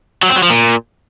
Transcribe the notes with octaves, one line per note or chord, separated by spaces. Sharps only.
F#3
C4
F#3
F3
A#2